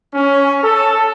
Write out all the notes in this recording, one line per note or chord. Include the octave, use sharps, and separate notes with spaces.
C#4
A4